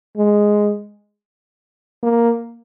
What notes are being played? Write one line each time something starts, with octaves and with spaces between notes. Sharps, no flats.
G#3
A#3